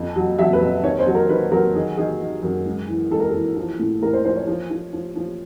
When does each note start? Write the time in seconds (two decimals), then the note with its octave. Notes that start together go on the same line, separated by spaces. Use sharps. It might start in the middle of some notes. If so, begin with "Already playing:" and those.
Already playing: F2
0.16 F#3
0.38 F#3 E5
0.53 B4
0.61 F2
0.83 D#3 C#5
0.99 C5
1.07 F#3
1.15 A#4
1.29 D#3 B4
1.51 F#3 A#4
1.75 D#3 G#4
1.97 D#3 G#4
2.20 D#3
2.43 F#2
2.65 G#2
2.88 E3
3.11 G#2 A4
3.20 A#4
3.29 E3 A4
3.57 F3
3.79 A2
4.02 A2 A#4
4.13 C5
4.25 F3 C5
4.36 C#5
4.47 F3
4.70 F3
4.93 F3
5.16 F3